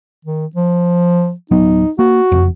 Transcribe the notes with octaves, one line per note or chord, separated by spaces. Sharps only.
D#3
F3
D1 F#3 B3 D#4
A#3 F#4
F#1 F2